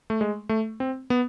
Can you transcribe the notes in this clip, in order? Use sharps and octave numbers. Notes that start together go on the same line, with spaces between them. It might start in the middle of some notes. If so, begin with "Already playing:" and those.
A3
G#3
A3
C4
B3